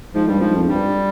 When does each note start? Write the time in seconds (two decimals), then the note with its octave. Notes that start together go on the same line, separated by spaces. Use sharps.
0.14 G#2 F3
0.27 G2 G3
0.39 G#2 F3
0.55 F2
0.68 G2 G3